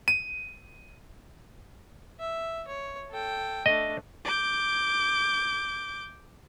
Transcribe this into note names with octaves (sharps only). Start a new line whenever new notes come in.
D#7
E5
C#5
A4 G5
A3 D4 D#5
D6 G6